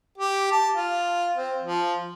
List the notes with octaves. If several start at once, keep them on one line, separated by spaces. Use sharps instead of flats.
G4
A5
F4
C4
F3